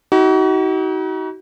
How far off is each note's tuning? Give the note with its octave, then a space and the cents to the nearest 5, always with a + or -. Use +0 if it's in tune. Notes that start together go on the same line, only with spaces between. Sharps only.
D#4 +40 F#4 +35